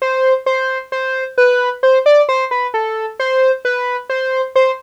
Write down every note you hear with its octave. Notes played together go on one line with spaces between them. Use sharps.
C5
C5
C5
B4
C5
D5
C5
B4
A4
C5
B4
C5
C5